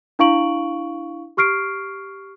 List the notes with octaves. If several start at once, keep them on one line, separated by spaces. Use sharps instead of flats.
D4 E4 F5 C#6 D7 F#7
G4 C#6 F6 C7 D7